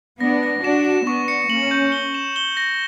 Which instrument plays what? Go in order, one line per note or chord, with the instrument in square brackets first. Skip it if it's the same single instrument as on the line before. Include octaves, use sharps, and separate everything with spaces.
[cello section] B3 D4 [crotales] A#6
[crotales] A#6
[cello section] D4 F#4 [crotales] E7
[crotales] E7
[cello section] B3 D4 [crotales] C#6
[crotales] C#7
[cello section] A#3 C#4 [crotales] F#7
[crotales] G6
G7
E7
G7
A#6